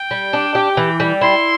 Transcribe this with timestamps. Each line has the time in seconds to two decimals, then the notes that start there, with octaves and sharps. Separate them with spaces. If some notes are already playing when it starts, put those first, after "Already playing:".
Already playing: G5
0.11 G3
0.33 D4
0.55 G4
0.77 E3
1.00 G3
1.21 E4 C6